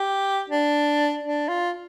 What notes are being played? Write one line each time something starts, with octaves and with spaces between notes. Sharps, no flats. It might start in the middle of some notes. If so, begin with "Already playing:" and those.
Already playing: G4
D4
D4
F4